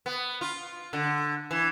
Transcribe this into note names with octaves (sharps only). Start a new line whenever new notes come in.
B3
F4
D3
E3